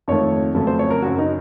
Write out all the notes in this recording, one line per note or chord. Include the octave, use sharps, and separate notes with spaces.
F2 D#3 A3 C#5
F2 C#3 F#3 A3
C5
C#5
A#4
F#2 C#3 F#3 F#4
D#4